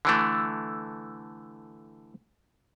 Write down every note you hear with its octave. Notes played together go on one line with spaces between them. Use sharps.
D3 E3 A3